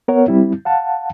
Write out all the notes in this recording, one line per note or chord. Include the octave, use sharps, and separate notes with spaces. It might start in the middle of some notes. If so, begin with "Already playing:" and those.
B3 A#4 C#5 F#5
G3 C4 E4
F5 F#5 A5